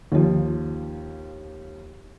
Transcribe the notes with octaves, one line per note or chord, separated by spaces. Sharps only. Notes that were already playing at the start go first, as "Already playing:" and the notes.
D#2 F3